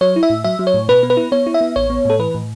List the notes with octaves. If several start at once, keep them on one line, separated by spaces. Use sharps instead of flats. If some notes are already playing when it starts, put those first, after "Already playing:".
F#3 C#5
E4
E5
A2
F#3 E5
F#3
C#5
A2
B2 B4
B3
B4
E4
B3 C#5
E4
E5
B3
A1 C#5
B3
A2 A4
E3 B4
A2